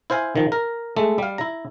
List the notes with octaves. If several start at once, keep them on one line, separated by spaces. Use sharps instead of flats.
E4 C5 F5 G#5
D#3 F3
A#4
G#3 A3 A4
G3 F5
E4 A#5